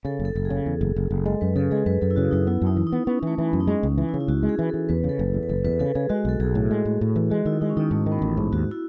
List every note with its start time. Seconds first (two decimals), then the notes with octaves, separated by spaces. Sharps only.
0.05 C#3 A4
0.20 F#1
0.25 A4
0.35 F#1 A4
0.45 G#4
0.50 C#3
0.66 E2
0.81 F#1
0.96 F#1
1.11 F#1
1.26 G#3 A4
1.41 F#2 B4
1.56 C#3 A4
1.71 G#3 G#4
1.86 F#2 B4
2.01 F#2 A4
2.11 E4
2.16 C#3 F#4
2.31 F#2 D#4
2.47 B3 E4
2.62 F#2
2.67 D#4
2.77 E3
2.87 D#4
2.92 B3
3.07 B3 C#4
3.23 E3 A3
3.38 E3
3.48 F#2 B3
3.60 D#4
3.67 G#3 C#4
3.83 C#2
3.98 E3
4.09 E4
4.14 C#3
4.21 E4
4.28 C#2 F#4
4.43 G#3
4.49 G#4
4.59 E3
4.69 E3 A4
4.89 E2 B4
5.04 C#3
5.09 A4
5.19 F#1
5.34 E2
5.43 B4
5.49 F#1 A4
5.64 E2 B4
5.79 C#3 A4
5.95 C#3 G#4
6.09 G#3 F#4
6.25 B1 A4
6.40 B1 G#4
6.55 A2
6.71 G#3
6.85 A2
7.01 A2
7.16 E3
7.30 G#3 F#4
7.46 D#3 E4
7.61 G#3 D#4
7.70 C#4
7.77 D#3 D#4
7.91 G#2 A3
8.06 D#3
8.12 B3
8.22 A1
8.37 G#2
8.52 D#2 F#4
8.71 E4